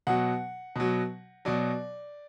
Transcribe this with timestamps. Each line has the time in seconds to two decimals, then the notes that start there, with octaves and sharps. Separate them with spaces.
0.07 B2 F#3 F#5
0.76 B2 F#3
1.45 B2 F#3 D5